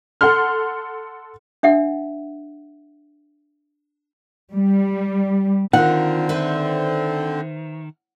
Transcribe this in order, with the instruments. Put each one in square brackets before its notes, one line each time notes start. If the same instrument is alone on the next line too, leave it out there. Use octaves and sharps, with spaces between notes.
[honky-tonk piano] A4 F#5 C6 F6
[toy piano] D4 E5 F#5
[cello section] G3
[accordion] D3 C4 [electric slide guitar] D#3 [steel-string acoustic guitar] F4 A#4 [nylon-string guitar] F#5
[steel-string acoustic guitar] B4 C5 E5